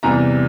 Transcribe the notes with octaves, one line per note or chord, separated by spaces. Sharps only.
E2 C3 E3 G3 A#5